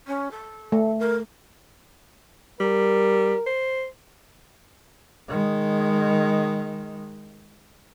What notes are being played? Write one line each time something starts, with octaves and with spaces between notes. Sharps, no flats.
C#4
A4
A3
A#4
G3 A#4
C5
D#3 G#3